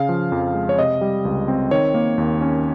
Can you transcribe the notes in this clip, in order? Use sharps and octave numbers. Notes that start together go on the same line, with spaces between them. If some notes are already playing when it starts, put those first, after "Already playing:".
Already playing: C#3 F5
F3
F2
G#3
C#5
C3 D#5
G3
C#2
C4
D#3 C#5
A#3
D#2
C#4